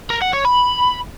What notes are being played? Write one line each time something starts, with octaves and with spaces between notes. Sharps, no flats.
A#4
F#5
C#5
B5